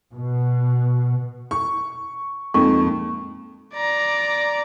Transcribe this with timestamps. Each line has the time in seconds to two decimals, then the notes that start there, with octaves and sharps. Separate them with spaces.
0.13 B2
1.51 C#6
2.54 F2 G#3 A#3 D#4 C#6
3.74 D5 A#5